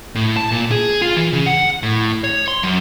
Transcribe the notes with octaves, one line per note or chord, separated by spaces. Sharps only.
A2
A5
A#2
G#4
F4
E3
C#3
F#5
A2
C#5
C6
F#2